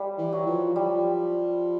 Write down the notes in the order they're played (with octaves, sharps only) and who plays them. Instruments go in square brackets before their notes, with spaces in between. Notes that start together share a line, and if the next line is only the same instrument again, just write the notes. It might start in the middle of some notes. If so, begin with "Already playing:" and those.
Already playing: [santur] G3
[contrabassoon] E3
[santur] F#3
[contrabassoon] F3
[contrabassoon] F3 [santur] G3